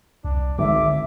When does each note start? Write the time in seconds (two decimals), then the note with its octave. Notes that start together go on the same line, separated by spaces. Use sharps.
0.24 C2 D4
0.58 G#1 D3 E5 D6